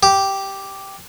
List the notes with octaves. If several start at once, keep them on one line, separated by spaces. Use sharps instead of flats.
G4